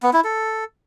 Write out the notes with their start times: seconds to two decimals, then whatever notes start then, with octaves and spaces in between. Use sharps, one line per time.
0.03 B3
0.14 E4
0.24 A4